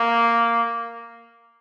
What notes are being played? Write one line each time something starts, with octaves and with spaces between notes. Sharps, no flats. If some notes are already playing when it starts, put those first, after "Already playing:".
Already playing: A#3